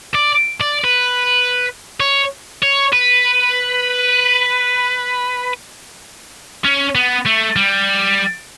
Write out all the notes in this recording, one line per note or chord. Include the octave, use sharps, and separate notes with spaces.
D5
D5
B4
C#5
C#5
B4
C#4
B3
A3
G3